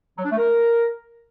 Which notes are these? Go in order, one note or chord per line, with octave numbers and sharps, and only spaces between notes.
F#3
D4
A3
A#4